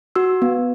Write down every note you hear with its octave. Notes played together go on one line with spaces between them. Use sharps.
F#4 E6
B3